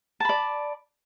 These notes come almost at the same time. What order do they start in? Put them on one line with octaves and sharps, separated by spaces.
A5 B5 D5